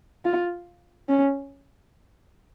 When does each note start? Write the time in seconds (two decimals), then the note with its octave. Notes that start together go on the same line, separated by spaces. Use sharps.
0.25 F4
1.09 C#4